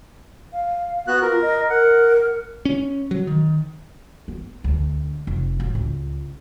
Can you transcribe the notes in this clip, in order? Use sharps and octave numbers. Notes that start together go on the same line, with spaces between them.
F5
B3 F#4 F#6
F4 A#4
D#5
A#4 F#5
C#4
F#3
D#3
B3
D2
F1
A2
C#2